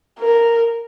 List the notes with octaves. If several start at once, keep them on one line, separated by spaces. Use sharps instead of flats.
A#4